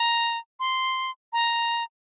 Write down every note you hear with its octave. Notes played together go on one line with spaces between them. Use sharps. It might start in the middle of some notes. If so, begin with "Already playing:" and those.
Already playing: A#5
C6
A#5